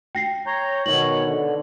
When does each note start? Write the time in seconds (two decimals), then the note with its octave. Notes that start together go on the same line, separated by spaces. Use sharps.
0.15 G5 A#6 C7
0.47 C#5 A#5 G6
0.86 B2 D#3 C#5 F#7
1.24 D3